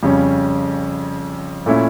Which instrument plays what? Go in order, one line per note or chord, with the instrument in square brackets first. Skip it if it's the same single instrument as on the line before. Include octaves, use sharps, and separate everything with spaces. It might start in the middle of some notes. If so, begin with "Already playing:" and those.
[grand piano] F2 C#3 G3 C#4
A#2 A3 C#4 E4